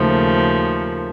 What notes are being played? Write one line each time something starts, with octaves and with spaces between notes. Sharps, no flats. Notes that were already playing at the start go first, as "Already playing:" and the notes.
Already playing: D#2 C#3 F3 A3